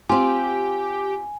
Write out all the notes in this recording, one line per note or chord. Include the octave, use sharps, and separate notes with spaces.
C4 F4 G4 G#5